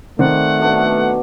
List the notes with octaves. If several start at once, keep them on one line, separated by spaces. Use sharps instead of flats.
D#3 A3 C4 D5 F#5
B2 D4 F#4